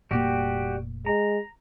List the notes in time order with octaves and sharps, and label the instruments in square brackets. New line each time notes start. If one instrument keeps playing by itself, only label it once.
[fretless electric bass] F1 A#2 A#3 [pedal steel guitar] G3 F#4 G4
[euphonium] G#3 [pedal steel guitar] A#5